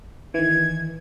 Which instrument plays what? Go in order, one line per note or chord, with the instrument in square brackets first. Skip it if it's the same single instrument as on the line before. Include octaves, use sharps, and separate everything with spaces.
[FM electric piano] D#3 E3 [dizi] G#6